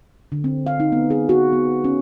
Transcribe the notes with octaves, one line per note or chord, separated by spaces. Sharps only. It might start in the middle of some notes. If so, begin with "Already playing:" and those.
D3
C4
F5
D#4
B3
G#4
F#4
B3
C#4